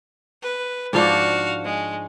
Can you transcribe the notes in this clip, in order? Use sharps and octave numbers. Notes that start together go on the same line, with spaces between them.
B4
G#2 F3 D4 F#4 F5
G#3